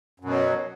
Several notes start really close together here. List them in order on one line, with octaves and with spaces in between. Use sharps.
F#2 B2 F#3